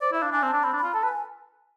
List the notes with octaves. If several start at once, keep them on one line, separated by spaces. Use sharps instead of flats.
C5 D5
E4 E5
D4 F5
D4 G#5
C4
A5
D4
C4 B5
D4
B5
F4
A4 A5
B4
G#5